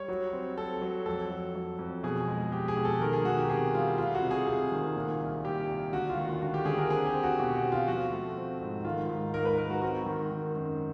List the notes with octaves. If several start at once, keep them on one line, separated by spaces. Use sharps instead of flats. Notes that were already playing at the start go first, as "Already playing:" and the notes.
Already playing: G3 C#5
F#3
C4
C4 A4
F#3
F2 A4
F#3
F#3
F2
B2 G#4
G#3
G#3 G4
G#4
B2
A4
D#3 A#4
G#4
D#3 F#4
G4
C3 G#4
G3 F4
A3 F4
F#4
C3
G#4
C3 G#4
D#3
A#2
C2
C2 G4
C2
D3 F#4
F4
D#2
F#4
D3 F#4
G4
D3 G#4
A#4
C4 G#4
G4
C4
F#4
B2 G4
F#4
C4
F4
F3 F#4
A3
C4
G#2
D#3 F4
G#2
G#2 A#4
B4
G#2 A#4
F#4
C4 F#4
D#3
D#3
F#2